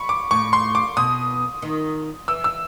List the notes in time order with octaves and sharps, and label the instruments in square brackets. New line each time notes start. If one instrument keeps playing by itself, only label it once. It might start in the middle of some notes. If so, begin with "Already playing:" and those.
Already playing: [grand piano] B5 C#6
D6
[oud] A2 [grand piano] C#6
[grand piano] C6
D6
[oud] B2 [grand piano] D#6
[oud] D#3
[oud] E3 [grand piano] E6
[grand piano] E6